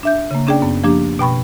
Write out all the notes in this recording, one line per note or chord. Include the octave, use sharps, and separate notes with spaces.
D4 E5 G6
C#3 A#3
C#4 D4 G#4 D5 G5
F#2 B3
F3 A#3 D4 G4
B2 G5 B5 C#6